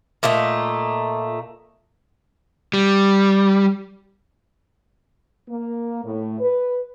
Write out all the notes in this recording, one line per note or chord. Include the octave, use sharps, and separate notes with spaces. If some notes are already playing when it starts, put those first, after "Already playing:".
A#2 A3 A#3 D#4
G3
A#3
A2
B4